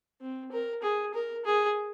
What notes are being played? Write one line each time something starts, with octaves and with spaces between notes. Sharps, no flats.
C4
A#4
G#4
A#4
G#4